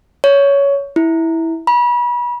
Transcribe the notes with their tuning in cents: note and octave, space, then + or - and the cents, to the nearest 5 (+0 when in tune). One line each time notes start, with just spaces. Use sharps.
C#5 +15
E4 -10
B5 -35